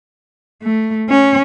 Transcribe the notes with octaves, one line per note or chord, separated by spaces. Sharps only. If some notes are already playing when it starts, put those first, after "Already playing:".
A3
C#4